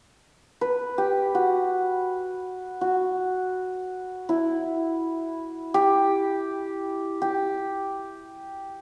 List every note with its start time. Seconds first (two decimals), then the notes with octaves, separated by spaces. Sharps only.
0.61 B4
0.98 G4
1.35 F#4
2.81 F#4
4.29 E4
5.74 G4
7.22 G4